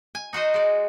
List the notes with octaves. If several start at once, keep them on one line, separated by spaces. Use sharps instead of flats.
G#5
D#4 F#4 C5 D#5
G#3 D5